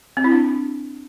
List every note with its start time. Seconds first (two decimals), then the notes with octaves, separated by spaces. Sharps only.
0.17 C4
0.24 E4
0.32 D4